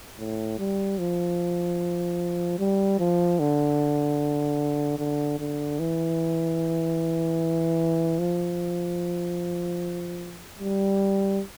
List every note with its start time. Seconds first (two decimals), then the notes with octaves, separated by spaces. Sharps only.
0.19 A2
0.59 G3
0.99 F3
2.59 G3
2.99 F3
3.40 D3
4.99 D3
5.40 D3
5.79 E3
8.19 F3
10.59 G3